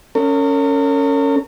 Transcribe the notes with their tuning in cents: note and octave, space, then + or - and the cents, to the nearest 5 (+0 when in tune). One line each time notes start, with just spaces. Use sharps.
C#4 +0 A#4 -40